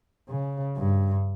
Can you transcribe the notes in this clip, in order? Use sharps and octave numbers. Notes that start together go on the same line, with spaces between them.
C#3
G2